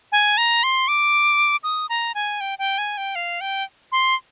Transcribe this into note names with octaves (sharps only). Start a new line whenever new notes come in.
G#5
A#5
C6
D6
D#6
A#5
G#5
G5
G5
G#5
G5
F5
G5
C6